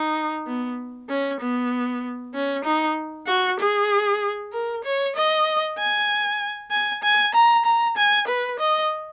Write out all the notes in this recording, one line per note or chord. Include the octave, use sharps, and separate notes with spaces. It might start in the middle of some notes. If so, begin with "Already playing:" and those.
Already playing: D#4
B3
C#4
B3
C#4
D#4
F#4
G#4
A#4
C#5
D#5
G#5
G#5
G#5
A#5
A#5
G#5
B4
D#5